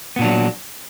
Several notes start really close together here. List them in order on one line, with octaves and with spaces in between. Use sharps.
B3 A#2 D4 F#3